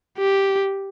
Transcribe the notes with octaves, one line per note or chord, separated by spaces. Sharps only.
G4